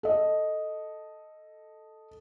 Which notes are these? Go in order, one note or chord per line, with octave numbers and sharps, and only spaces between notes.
A4 D#5